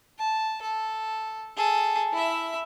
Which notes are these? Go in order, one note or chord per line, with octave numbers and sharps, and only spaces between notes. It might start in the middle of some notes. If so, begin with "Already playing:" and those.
A5
A4
G#4 A4
E4 E5